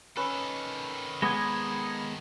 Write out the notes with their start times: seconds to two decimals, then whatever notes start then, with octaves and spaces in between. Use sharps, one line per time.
0.17 D#3 C#4 A4 B4
1.22 G#3 B3 F#5 B5 C6 D6 D#6 G#6